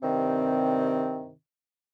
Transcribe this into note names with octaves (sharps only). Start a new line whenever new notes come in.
G2 C3 D#3 C4